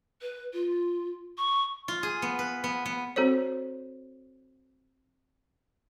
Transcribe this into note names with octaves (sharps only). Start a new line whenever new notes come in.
B4
F4
C#6
F4
G#4
B3
B4
B3
B3
C4 F#4 A4 C5 C#5